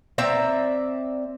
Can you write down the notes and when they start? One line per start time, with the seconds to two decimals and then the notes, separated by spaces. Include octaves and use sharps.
0.18 C4 D5 E5 A#5